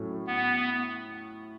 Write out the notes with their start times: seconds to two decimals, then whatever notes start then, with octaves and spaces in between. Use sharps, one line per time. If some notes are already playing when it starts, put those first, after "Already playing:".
Already playing: A2 F#3 A3 C#4
0.27 B3